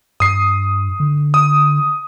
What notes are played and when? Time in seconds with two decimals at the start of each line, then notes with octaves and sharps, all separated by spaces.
0.20 G2 D#6 C7
1.00 D3
1.34 D#6